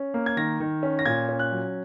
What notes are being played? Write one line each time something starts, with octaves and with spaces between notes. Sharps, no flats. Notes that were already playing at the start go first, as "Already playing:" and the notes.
Already playing: C#4
A#3
G#6
D#3 A#6
D#3
C#4
A#6
A#2 G#6
C#4
F#6
F#3